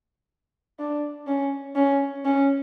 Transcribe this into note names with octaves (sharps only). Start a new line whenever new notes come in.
D4
C#4
C#4
C#4